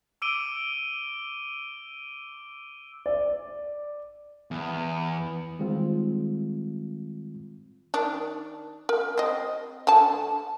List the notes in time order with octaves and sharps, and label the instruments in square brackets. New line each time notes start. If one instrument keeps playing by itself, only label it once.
[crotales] D6 E6 D7 D#7 G7
[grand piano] D5
[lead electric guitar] E2
[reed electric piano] D#3 G3 G#3 C4 F4
[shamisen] D#3 D4
A#4
C4 D#5
D3 A5